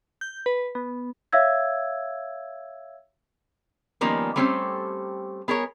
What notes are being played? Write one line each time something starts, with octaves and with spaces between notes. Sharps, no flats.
G6
B4
B3
C#5 E5 F5 E6 G#6
D#3 F3 G3 A#3 B3 C#4
G3 A3 C4 C#4 G4 A4
B3 G#4 A#4 C#5